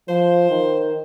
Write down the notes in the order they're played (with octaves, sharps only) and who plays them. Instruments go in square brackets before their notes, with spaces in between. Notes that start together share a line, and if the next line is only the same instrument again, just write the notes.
[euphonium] F3 [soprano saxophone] C5
[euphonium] D#3